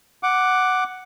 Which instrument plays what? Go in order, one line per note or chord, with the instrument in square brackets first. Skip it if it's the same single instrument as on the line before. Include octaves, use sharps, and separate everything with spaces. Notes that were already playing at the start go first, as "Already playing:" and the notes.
[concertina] F#5 D6